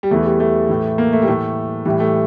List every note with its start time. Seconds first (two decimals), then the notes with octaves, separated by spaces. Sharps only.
0.03 G3
0.11 E2 E3 A3
0.25 G3
0.40 A3
0.69 A2 E3
0.98 A#3
1.13 A3
1.22 G3
1.28 A2 E3 A3
1.85 A2 E3 G3
2.00 A3